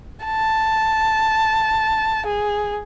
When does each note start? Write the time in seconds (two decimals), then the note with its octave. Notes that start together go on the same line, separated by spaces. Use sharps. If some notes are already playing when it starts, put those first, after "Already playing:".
0.25 A5
2.26 G#4